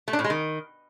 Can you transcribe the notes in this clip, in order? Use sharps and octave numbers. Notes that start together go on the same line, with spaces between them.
A3
D4
A2
G#3
D#3